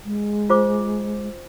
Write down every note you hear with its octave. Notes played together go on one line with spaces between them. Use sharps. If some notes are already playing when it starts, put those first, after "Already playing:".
G#3
F4 C5 D6